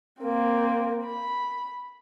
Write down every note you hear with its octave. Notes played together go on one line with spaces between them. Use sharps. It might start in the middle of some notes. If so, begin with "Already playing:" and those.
A#3 C4
B5